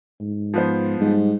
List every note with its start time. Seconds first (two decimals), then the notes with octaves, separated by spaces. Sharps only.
0.21 G#2
0.54 F3 B3 C5
1.00 G#2 G3